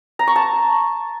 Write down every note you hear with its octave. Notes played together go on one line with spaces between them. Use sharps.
A#5
C#6
A5